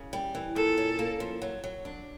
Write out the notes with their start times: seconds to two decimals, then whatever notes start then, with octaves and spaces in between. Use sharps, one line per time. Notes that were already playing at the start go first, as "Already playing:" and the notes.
Already playing: C#3
0.13 G3
0.35 E3
0.56 A#2 A4
0.78 C#4
0.99 A#3
1.20 F3
1.42 F#3
1.64 F#3
1.85 D4